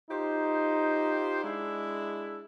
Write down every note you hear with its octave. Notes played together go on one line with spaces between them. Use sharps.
D#4 F4 G4 C5
G#3 D4 E4